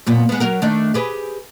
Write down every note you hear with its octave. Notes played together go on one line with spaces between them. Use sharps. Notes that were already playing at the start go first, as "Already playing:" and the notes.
F#2 A#2 B3
G#3 B3
F#3 F#4 A#4
D#3 A3 D4
G4 G#4 B4